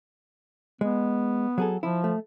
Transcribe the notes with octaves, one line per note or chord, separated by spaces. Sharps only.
G#3 B3
F#3 G#4 A4
F3 E4
A3